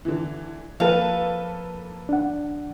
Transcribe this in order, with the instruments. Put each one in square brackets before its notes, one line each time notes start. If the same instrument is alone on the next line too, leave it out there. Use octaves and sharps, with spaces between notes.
[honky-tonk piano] D3 E3
[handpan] F3 [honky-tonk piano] A#3 A4 B4 [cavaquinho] F5
[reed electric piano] D4 F#5